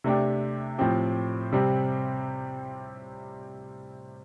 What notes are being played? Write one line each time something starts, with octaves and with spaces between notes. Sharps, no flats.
C3 A3 D4 G4
A2 F3 C4 G4
C3 G3 C4 G4